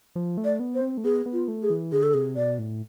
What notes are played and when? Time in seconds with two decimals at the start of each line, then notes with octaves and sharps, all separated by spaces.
0.16 F3
0.38 A3
0.45 D5
0.60 B3
0.75 C5
0.81 C4
0.97 A3
1.04 B3 G#4
1.26 B3
1.33 F4
1.48 A3
1.63 G#4
1.70 E3
1.92 D3 G#4
2.03 A4
2.14 C3 G#4
2.36 B2 D5
2.59 A2